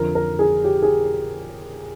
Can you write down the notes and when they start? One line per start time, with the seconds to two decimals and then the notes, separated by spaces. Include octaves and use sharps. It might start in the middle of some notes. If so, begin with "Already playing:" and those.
Already playing: F2 D3 A#4
0.15 A#4
0.39 G#4
0.64 G4
0.82 G#4